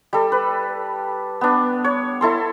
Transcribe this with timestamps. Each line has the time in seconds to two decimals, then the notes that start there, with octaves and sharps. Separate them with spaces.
0.13 G3 A4
0.32 B4
1.41 B3 D4
1.84 C#5
2.21 E4 A4 C6